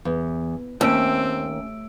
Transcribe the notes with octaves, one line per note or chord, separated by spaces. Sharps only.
E2
D#2 A3 C4 C#4 E6 D7